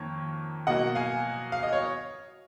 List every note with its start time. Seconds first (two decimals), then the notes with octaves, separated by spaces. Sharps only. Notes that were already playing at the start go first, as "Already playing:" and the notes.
Already playing: F2 D#3 A#3 C#5
0.67 B2 F#3 A#3 D#5 F#5
0.95 F5 G#5
1.52 F5
1.63 D#5
1.73 C#5